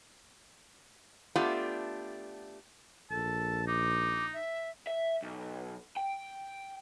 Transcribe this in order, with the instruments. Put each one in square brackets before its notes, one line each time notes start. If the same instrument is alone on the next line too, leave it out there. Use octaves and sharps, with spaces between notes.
[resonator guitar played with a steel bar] A3 B3 D4 F4 G4
[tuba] A#1 [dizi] A4 [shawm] A5
[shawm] D#4 [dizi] D6
[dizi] E5
[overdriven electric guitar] E5
B1
G5